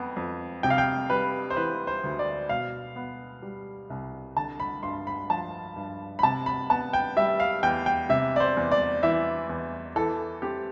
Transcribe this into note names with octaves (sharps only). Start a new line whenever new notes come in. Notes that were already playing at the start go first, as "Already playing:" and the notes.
Already playing: F2 B3
F2
C3 G5
F5
G5
G3 B4
C5
E3 B4
C5
D2
D5
B2 F5
B3
G3
C2
D3 A5
B5
G2 C6
B5
F3 A5
G2
B5
C3 A5
B5
B3 A5
G5
G3 E5
F5
E2 G5
G5
C3 E5
D5
C5
E2
D5
E3 E5
E2
E3 A4
C4 G4